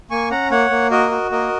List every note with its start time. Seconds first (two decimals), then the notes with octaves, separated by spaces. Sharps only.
0.11 A#3 G#5 C#6
0.31 C#4 F#5 A#5
0.50 A#3 C#5 F#5
0.70 A#3
0.91 F#4 A#4 D#5
1.11 F#4
1.31 A#3 A#4 D#5